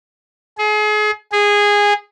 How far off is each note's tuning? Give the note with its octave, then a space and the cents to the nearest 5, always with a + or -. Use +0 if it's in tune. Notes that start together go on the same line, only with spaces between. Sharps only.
G#4 +35
G#4 -15